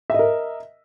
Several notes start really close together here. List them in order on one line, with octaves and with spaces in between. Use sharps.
E5 D#5 A#4